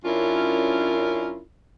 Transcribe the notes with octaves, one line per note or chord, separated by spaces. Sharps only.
F#2 C#4 D4 E4 F4 A#4